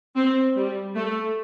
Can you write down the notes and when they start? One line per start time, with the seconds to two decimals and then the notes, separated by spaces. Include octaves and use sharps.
0.16 C4
0.56 G3
0.96 A3